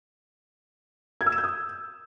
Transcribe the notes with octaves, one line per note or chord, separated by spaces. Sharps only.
G#6
E6
E7
G6
D#6